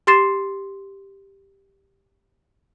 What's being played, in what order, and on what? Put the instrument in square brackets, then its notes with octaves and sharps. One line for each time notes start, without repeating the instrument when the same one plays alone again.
[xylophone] G4 C6 A6 C7 E7